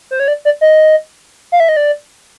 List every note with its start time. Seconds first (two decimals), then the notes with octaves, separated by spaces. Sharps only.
0.11 C5
0.20 C#5
0.28 D5
0.45 D5
0.61 D#5
1.52 F5
1.60 E5
1.69 D#5
1.77 D5